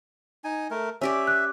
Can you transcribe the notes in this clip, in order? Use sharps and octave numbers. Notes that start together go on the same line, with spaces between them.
D#4 G#5
A3 A#4
C#4 G4 D5 E5
F#6